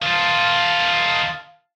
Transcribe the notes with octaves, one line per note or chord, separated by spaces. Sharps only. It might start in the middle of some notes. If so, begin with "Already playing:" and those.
D#3 F4 F5 A5